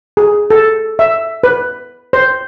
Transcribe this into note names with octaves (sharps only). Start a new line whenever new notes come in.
G#4
A4
E5
B4
C5